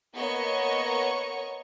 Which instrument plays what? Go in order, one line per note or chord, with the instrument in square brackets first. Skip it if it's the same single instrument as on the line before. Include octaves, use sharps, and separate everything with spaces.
[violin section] A#3 B3 C#5 D#5 C#6